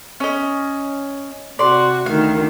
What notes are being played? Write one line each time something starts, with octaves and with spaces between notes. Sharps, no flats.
C#4 D#5
C3 F#4 D5 C6
D2 D#3 F5